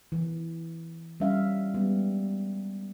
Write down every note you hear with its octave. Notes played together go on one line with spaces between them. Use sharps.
E3
G3 C#4 E5 F5
G3 G#3 B3